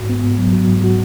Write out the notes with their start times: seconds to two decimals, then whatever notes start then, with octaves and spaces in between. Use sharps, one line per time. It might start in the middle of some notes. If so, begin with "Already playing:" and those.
Already playing: G#2 F#4
0.09 B3
0.24 G#2
0.38 F#3
0.53 F#3
0.68 G#2
0.84 F#4